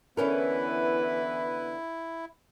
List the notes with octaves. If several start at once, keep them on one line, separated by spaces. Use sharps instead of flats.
D3 E3 B3 C#4 E4 A#4 B4